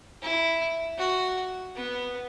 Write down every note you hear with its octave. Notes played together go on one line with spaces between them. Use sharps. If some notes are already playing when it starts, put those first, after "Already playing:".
E4
F#4
B3